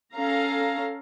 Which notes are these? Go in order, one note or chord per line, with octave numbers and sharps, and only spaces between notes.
C#4 A4 F5 A#5